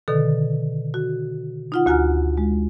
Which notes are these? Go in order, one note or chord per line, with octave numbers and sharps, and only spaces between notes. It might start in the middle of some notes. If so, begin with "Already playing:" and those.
B2 D3 D#3 A4
F#4
D#4 F4 F#5
D2 F#4 G#5 A#5 F6
G#3